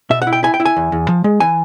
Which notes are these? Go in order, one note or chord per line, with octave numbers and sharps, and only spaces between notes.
B2 E5
F#5
E4
G5
E4 G#5
G5
E4
G#5
E2
E2
F3
G#3
E3 G#5